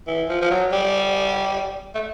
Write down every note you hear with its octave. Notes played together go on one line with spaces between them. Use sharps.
E3
F3
F3
F#3
G3
A3